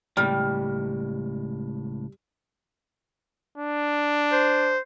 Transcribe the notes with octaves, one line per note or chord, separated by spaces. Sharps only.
C#2 A2 G3 F6
D4
C5